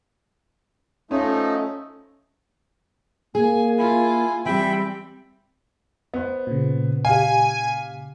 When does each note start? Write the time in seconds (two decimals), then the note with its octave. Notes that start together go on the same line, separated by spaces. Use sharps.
1.11 F3 A3 C#4 D#4
3.35 A#3 G#4 G#5
3.78 E4 F4 G#5
4.46 E3 G3 C4 G4 E5 G5 B5
6.14 B3 C5
6.47 A#2 C#3
7.05 G4 F5 G#5